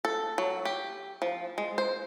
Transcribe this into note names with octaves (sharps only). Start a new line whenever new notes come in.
A4
F#3
G4
F3
G#3
C5